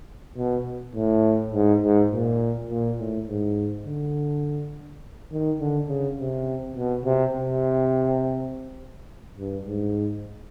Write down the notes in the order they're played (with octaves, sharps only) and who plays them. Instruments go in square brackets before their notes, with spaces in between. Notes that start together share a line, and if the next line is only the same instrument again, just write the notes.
[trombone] B2
A2
G#2
G#2
A#2
A#2
A2
G#2
D3
D#3
D3
C#3
C3
B2
C3
C3
G2
G#2